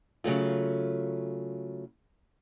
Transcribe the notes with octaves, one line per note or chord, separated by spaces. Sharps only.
C#3 F#3 A3 F4